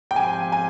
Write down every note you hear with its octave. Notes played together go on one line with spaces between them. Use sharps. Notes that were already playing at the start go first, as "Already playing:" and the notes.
G5
G#2 F3 C4 G4 G#5
G#5